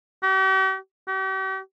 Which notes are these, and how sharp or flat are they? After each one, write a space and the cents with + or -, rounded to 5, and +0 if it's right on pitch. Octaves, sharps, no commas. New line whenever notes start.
G4 -45
G4 -45